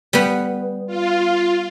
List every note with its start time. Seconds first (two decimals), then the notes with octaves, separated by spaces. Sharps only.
0.13 G3 B3
0.87 F4